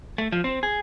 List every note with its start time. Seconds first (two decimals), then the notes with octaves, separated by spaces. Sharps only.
0.18 A3
0.32 F3
0.44 C4
0.63 G#4